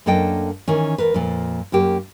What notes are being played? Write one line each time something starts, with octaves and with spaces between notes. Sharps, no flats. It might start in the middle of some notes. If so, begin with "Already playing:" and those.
F#2 A#3 D4 A4 D#5 G5
D#3 E3 C#4
E2 A#4 B4
F2 A#2
F#2 A#3 G4